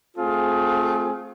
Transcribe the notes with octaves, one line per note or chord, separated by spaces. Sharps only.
A3 C4 F4 G#4